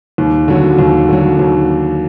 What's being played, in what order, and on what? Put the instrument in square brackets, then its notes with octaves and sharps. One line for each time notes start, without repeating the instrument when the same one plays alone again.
[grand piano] D#2
D3 F#3
D#2
D3 F#3
D#2